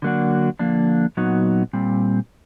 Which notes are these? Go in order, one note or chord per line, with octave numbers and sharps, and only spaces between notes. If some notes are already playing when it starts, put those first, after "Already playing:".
D3 F#3 A#3 D4 F#4
D3 F3 A#3 D4
A#2 F#3 B3 D#4 F#4
A#2 G3 C4